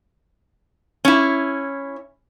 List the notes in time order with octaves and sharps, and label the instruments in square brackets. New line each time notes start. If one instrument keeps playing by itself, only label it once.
[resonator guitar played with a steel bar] C#4 E4